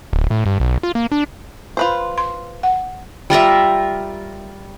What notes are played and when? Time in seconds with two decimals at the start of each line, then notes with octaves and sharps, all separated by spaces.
0.13 D1
0.31 A2
0.46 G2
0.60 B1
0.83 F4
0.95 A#3
1.12 D4
1.77 F4 B4 C5
2.18 C6
2.63 F#5
3.30 G3 F4 A#4 E5